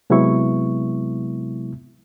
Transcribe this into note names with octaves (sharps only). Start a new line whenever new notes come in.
C3 F#3 G#3 B3 E4 C#6